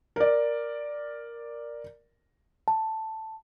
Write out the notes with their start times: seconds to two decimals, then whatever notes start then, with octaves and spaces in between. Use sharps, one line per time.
0.16 A#4 D5
2.68 A5